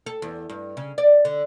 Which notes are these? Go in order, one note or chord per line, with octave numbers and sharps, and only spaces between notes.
A4
E2
G2
C#3
D5
D3